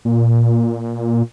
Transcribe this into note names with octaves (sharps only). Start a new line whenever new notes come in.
A#2